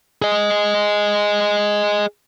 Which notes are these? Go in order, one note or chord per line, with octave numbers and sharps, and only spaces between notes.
G#4 D#5